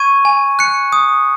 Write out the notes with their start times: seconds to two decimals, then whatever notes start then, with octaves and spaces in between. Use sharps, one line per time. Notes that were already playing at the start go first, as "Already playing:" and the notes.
Already playing: C#6 G#6 D#7
0.25 G#5
0.59 F#6 C#7
0.93 D#6